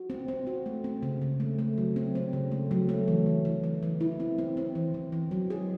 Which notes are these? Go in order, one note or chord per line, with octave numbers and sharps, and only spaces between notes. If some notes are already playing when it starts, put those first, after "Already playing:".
Already playing: F#4
C4
C4
F#4
A3
C4
C#3
C#3
A3
A3
F#3
C4
C4
C#3
A3
F#3
A3
E3
E3
E3
E3
E3
E4
C4
C4
C4
E3
E3
E3
F#3
G#4